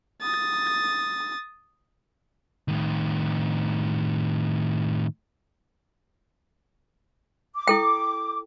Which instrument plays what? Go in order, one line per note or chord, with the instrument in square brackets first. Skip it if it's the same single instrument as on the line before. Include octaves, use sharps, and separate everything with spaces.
[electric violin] D#6 A6
[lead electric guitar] A2 D#3
[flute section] D6
[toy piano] E4 A4 G5